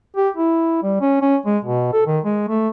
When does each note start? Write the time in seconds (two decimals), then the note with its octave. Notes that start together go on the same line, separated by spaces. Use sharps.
0.16 G4
0.37 E4
0.83 G3
1.01 C#4
1.21 C#4
1.46 G#3
1.65 B2
1.93 A4
2.06 D#3
2.25 G#3
2.48 A3